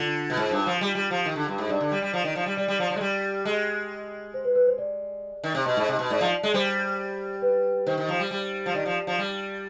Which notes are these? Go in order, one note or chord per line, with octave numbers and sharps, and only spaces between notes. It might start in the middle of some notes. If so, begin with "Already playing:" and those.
Already playing: D3 F4
B2
G#2
G2
F3
G3
G3
F3
D#3
D3
G2
G#2
G2 D5
D3
G3
G3
F3
D#3
F3
G3
G3 D5
G3
F3
F3
G#3
G3
G#3 D#5
C5
B4
B4
C5
D5
D#3
C3
B2 D#5
G#2
C3
B2
G#2 D5
F3
G#3
G3 C5
B4
D#3 C5
D#3
F3
G3
G3
F3
D#3 D5
F3
F3
G3